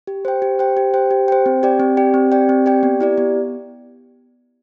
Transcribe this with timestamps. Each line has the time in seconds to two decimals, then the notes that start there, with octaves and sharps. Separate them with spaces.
0.07 G4
0.25 C5 G5
0.42 G4
0.59 C5 G5
0.77 G4
0.94 C5 G5
1.11 G4
1.28 C5 G5
1.46 C4
1.63 G4 D5 G5
1.80 C4
1.97 G4 D5 G5
2.14 C4
2.32 G4 D5 G5
2.49 C4
2.66 G4 D5 G5
2.83 B3
3.01 E4 G4 D5
3.18 B3